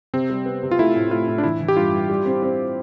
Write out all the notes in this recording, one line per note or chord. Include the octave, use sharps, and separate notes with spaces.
C3 C4
G3
B3
C3
F4
A3 E4
A2
A3 F4
A2
D4
E3 E4
E3
G4
G2 F4
G2
G3
C4
C4